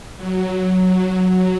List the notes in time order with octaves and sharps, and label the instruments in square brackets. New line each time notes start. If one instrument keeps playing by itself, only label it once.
[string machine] F#3